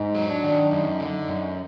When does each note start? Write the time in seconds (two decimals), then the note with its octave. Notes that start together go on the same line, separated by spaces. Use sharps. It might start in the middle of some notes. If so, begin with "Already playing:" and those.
Already playing: G#2 D#4
0.15 F#3
0.29 D4
0.43 D#3
0.71 F#2 D#4
0.99 D3
1.28 F#2